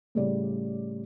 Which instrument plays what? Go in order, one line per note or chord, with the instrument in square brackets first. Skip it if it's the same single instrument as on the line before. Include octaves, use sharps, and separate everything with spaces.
[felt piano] A2 C#3 G3 D5